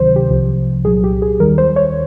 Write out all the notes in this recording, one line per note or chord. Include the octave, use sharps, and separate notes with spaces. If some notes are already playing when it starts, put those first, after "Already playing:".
Already playing: D2 C3 D#3 F#3 C5
G4
C2 C3 F3
C2 A#2 F#3 G#4
G4
G#4
D#2 D#3 G3 A#4
C5
C#5